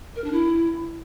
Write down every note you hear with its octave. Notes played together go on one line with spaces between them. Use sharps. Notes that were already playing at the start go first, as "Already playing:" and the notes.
A#4
D4
E4